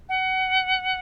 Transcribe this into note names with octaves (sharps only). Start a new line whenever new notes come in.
F#5